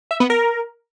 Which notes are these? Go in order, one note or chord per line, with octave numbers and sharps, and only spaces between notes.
E5
B3
A#4